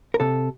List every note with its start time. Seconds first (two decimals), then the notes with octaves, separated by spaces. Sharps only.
0.14 A#4
0.20 C3 A4